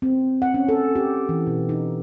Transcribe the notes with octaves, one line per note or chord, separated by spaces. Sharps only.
C4
F#5
C#4
A4
G4
E3
B2
D#4